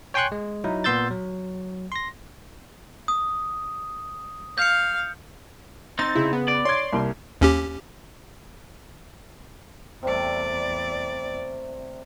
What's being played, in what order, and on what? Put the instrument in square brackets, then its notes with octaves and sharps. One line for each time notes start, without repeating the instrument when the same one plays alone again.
[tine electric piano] C#5 G5 G#5 C6 C#6 F#6
G#3
F#3 D#4 E4
A#2 B3 C6 E6 G6 A6
F#3
C6 A#6
[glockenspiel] D#6
[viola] F5 [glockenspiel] G6 C#7
[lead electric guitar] C4 D#4 [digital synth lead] A6
[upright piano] C#3 [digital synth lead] E4
[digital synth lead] B3
[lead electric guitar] D5
[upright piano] C#5 G#6 [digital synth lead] C6
[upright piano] C2 A#3
[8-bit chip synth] D#2 C#4 G4
[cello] E2 D5 [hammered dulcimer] C3 G3 A3